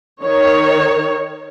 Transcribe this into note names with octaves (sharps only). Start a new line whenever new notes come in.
D#3 C#5